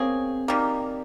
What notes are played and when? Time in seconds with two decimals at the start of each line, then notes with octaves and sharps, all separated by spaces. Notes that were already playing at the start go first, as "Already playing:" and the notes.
Already playing: A#3 C4 C#4 G#4
0.48 D#3 G3 A#3